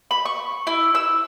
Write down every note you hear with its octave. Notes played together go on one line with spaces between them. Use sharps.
B5
C#6
E4
E6